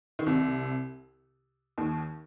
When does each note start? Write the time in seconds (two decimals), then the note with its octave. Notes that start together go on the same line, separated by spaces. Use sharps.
0.19 D#3
0.27 C2 C3
1.78 D#2 D#3